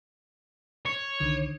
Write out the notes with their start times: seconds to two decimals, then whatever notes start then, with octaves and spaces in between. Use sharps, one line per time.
0.86 C#5
1.20 C2 D3 D#3